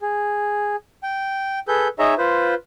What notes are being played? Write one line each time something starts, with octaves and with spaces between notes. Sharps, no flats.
G#4
G5
G#4 A4 B4 G6
D#4 G#4 C#5 D#5 E5 A#5
F4 B4 C5